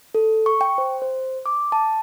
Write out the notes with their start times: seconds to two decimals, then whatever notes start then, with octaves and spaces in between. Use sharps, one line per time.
0.15 A4
0.46 C#6
0.61 G5
0.78 C5
1.02 C5
1.46 D6
1.72 A5